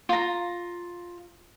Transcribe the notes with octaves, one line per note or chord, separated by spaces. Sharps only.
F4 A#5